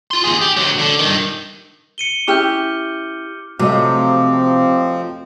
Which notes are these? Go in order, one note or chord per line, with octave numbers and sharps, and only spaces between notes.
F4 C6
D#2 G#4
G4
D2 F#3
D3 D4
G2 D#3
C#7 D#7 G7
C#4 E4 G4 D6 F6 G6
C3 F3 F#3 A3 C4 D#5 D6